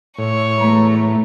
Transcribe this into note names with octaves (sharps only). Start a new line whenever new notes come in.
A2 C#5
E2 A3 B4 A#5